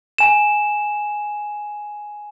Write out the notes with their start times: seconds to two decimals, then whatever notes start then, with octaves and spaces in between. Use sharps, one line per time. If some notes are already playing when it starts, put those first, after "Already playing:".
0.18 G#5 E7